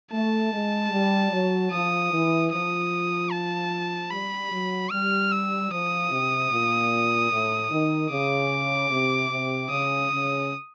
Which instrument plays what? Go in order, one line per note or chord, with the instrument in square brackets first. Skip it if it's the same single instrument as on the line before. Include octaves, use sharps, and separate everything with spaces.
[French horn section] A3 [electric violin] A5
[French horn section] G#3
G3
F#3
[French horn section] F3 [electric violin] D#6
[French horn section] E3
[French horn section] F3 [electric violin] D#6
[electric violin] A5
[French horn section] G3 [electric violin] B5
[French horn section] F#3
[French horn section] G3 [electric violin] F6
[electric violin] E6
[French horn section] F3 [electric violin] D#6
[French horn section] C3
A#2
A2
D#3
[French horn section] C#3 [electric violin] D6
[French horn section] C3
C3
[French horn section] C#3 [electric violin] D#6
[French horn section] C#3